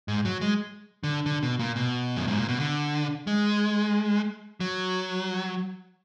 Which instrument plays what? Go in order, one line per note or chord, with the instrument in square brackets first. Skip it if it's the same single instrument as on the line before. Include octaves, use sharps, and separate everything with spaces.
[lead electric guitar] G#2
F#3
G#3
D3
D3
B2
A#2
B2
F#2
G#2
A#2
B2
D3
G#3
F#3